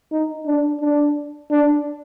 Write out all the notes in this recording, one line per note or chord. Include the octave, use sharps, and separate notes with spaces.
D#4
D4
D4
D4